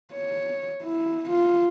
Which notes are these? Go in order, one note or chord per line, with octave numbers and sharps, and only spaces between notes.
C#5
E4
F4